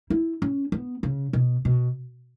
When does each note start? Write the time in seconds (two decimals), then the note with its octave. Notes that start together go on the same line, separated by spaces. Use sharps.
0.10 E4
0.42 C#4
0.72 B3
1.03 C#3
1.33 B2
1.65 B2